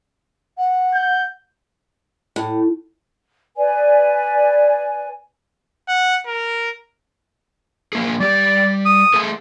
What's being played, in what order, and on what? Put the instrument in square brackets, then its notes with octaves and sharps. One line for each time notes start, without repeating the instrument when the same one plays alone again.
[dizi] F#5
[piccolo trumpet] G6
[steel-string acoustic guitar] A2
[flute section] B4 D5 G#5
[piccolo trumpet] F#5
A#4
[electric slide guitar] F3 A#3 G#4
[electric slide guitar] G3 G4 [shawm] D5
[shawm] D#6
[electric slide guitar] A3 G#4 A4